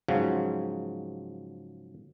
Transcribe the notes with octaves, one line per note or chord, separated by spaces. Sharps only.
G#2 C#3 F3 F#3